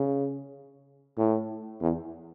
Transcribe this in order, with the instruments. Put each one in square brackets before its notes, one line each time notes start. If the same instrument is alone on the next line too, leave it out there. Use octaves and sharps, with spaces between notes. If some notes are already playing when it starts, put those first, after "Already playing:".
Already playing: [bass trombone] C#3
A2
E2